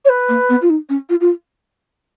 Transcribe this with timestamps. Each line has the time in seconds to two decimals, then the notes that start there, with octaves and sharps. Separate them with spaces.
0.05 C#5
0.09 B4
0.29 A#3
0.49 B3
0.62 F4
0.70 D#4
0.89 C#4
1.10 F4
1.21 F4